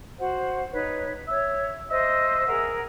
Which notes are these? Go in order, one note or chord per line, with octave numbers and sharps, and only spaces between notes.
F#4 C5 F#5
D#4 B4 C#5
C#5 E5
C5 D#5 E5
G#4 A#4 F#5